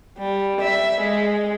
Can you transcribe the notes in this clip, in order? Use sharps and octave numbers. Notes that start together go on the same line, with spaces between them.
G3
E5
G#3